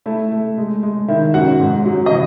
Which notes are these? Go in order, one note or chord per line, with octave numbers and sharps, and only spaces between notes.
A3 E4 E5
A3
G#3
G#3
D#3 E4 E5
F#2 F#4 F#5
G#2
F#3
D#5
E3